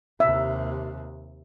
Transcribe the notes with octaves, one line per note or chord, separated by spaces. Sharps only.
D#2 C3 E5